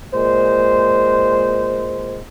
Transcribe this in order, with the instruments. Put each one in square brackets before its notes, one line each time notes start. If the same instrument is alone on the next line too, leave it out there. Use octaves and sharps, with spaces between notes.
[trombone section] A#2 G#3 C5